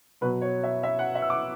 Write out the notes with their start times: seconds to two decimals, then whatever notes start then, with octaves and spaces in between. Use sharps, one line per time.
0.21 B2 F#3 B4
0.41 C#5
0.63 E5
0.83 E5
0.99 F#5
1.15 E5
1.22 E6
1.30 D6